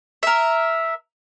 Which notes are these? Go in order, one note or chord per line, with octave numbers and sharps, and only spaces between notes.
A#4 E5